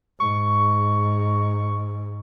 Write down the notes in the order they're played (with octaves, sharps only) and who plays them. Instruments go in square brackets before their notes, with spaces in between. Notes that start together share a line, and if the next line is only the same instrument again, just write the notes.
[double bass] G#2 [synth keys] C#6